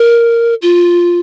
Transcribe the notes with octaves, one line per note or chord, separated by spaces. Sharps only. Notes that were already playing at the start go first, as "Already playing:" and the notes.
Already playing: A#4
F4